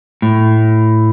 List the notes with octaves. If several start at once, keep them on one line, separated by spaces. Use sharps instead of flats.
A2